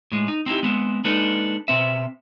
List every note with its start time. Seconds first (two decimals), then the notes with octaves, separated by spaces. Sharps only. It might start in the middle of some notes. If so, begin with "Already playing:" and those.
0.12 A2 G#3
0.28 D#4
0.46 C4 D#4 E4 G4
0.63 G#3 B3 C4
1.04 G#3 A#3 D4 D#4 A4 B4
1.68 B2 C4 E5